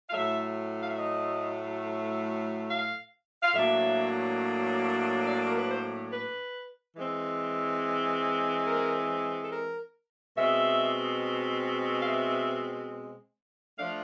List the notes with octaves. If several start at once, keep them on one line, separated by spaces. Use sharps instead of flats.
F5
A2 F#3 A3 E5
F5
E5
D#5
F5
F5
A2 F#3 A#3 D4 E5
D5
A#4
B4
C5
B4
E3 G#3 C4
A#4
A4
A#4
B2 G#3 C4 E5
F5
E5
F3 A3 D4 F5